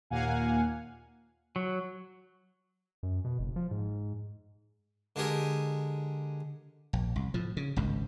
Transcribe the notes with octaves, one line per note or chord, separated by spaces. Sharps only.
D#2 A#2 A#3 F5 F#5 G#5
F#3
F#2
B2
F#1
F3
G#2
D3 G#3 G4 G#4 A#4
A#1
C2
A2 F3
C#3
G#1 C#2 G2